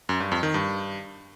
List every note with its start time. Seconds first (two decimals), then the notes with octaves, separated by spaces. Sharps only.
0.09 F#2
0.20 G2
0.32 F2
0.43 D#3
0.54 G2